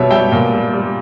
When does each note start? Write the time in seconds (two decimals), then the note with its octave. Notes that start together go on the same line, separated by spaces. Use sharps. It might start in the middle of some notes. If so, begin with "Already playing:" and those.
Already playing: B2 G3 C#5 E5
0.10 G3 E5 G5
0.32 A#2
0.53 G3
0.73 G3